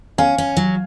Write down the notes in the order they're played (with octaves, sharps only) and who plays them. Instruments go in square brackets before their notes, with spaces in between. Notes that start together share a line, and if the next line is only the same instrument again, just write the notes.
[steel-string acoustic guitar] C#4 [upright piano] F5 G#5
[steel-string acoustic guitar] C#4
F#3